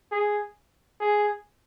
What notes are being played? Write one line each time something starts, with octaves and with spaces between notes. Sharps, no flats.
G#4
G#4